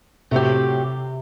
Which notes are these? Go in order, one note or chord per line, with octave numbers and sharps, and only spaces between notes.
A2 C3 F#3 C4 G4